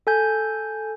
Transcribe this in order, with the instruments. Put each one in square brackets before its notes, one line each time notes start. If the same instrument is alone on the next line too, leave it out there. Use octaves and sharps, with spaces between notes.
[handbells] A4 G#5 G6